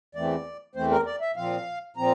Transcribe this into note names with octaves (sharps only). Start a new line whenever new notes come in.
E2 E3 A3 C4 D5
E2 E3 A3 C4 C5
A#4
D5
E5
A#2 F3 C4 F5
A#2 F3 C4 A#5